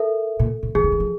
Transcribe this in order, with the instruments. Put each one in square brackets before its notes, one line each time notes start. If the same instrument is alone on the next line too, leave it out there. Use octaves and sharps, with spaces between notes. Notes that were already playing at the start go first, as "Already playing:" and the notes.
Already playing: [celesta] A4 A#4 E5
[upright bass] A#2
A#2
[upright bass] E3 [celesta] G#4
[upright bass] D#3
E3
F3